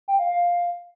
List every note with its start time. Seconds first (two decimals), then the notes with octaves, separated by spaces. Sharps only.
0.08 G5
0.19 F5
0.30 F5